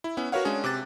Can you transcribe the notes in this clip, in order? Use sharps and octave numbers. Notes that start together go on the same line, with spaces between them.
E4
B3 C#4 E4
F#4 A#4 B4 C#5 F5 F#5
G#3 C#4 D4 G#4
C3 D6 F#6 A6